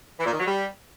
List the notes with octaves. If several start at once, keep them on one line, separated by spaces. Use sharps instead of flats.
E3
A#2
D#3
F#3
G3